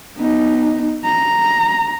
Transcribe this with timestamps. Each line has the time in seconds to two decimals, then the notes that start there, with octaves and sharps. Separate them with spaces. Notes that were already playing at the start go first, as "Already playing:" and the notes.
0.17 B3 D#4
1.05 A#5